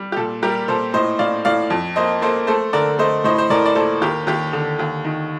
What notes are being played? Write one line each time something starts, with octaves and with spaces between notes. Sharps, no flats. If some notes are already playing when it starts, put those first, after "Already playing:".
Already playing: G3
G4
A#2 A4
G3 G4 A#4
A#2 A4 C5
A2 C5 D#5
A2 D5 F5
A2 D5 F5
F2
A#3 C5 D#5
A#3 A4 C5
A3 A4 C5
D3 A#4 D5
A3 C5 D#5
A2 C5 D#5
C5
A2 A#4 D5
D5
A#3 A4 C5
D#2 G4 A#4
D#2 G4
D3
D#2
D#3